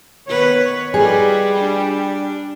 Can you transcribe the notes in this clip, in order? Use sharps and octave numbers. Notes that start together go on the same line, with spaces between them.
D#3 B3 B4 C#5
G3 D#4 F4 G#4 B4
D4